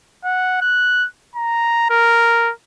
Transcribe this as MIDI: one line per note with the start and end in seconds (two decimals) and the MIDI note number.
0.24 0.58 78
0.61 1.07 90
1.35 1.87 82
1.90 2.51 70